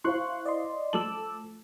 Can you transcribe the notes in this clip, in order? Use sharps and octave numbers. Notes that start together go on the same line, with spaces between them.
E4 C5 F5 C6 C#6 F#6
D5 D#5 C6
F3 A3 A5 D6 E6 F#7